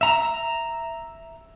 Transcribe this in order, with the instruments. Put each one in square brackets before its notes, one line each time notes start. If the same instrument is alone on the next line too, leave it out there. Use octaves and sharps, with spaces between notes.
[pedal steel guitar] E5 A#5